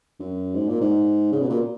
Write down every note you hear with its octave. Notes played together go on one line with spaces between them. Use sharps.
F#2
G#2
A#2
G#2
C#3
B2
A#2